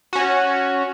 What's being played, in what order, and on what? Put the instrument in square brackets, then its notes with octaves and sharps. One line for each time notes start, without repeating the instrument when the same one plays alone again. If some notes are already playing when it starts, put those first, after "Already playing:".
[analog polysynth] C#4 F#4